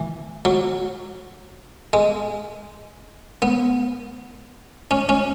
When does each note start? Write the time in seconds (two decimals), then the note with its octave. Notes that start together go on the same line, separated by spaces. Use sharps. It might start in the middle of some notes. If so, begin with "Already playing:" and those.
Already playing: E3
0.45 F#3
1.93 G#3
3.42 B3
4.91 C#4
5.09 C#4